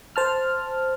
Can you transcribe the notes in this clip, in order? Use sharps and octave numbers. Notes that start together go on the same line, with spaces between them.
C5 A5 F6